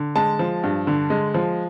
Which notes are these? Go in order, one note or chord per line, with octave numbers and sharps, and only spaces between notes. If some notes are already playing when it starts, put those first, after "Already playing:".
Already playing: D3
G#3 A5
F3
G2
D3
G#3
F3